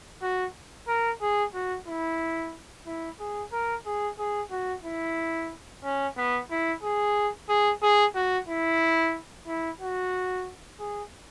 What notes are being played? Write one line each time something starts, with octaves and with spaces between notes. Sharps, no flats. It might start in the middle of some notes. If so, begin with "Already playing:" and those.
F#4
A#4
G#4
F#4
E4
E4
G#4
A#4
G#4
G#4
F#4
E4
C#4
B3
E4
G#4
G#4
G#4
F#4
E4
E4
F#4
G#4